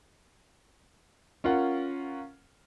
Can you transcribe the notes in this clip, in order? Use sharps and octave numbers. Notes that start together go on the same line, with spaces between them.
C#4 F4 A#4 F#5